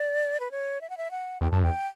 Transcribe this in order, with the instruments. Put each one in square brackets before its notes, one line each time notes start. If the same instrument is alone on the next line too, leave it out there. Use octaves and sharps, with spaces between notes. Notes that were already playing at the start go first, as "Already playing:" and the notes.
Already playing: [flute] D5
B4
C#5
E5
F#5
E5
F#5
[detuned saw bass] E2 [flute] G5
[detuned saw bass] F#2 [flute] A5
[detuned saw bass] E2 [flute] G5